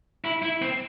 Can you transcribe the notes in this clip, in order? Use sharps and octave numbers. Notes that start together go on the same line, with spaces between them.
E4
E4
C4